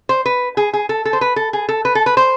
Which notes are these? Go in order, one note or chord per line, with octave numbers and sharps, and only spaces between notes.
C5
B4
G#4
G#4
A4
A4
C5
B4
A4
G#4
A4
B4
A4
B4
C5